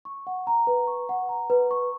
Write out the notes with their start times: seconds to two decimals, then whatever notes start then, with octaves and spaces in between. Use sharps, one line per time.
0.05 C#6
0.27 F#5
0.47 A#5
0.67 B4
0.87 C#6
1.09 F#5
1.29 A#5
1.50 B4
1.71 C#6